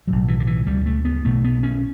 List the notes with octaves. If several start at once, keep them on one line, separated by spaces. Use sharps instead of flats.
B1 A2 F#3
E3
D3
E3
D2 C#3 G3
A3
B3
B1 B2 A3
B3
C#4